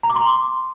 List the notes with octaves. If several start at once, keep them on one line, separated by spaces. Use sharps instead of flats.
A#5
D6
C6